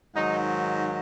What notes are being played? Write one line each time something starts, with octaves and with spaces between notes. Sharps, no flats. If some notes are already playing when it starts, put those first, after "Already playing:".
G#2 D#3 F#3 D#4